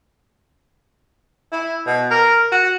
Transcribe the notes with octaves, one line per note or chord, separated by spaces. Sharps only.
E4
B2
A#4
F#4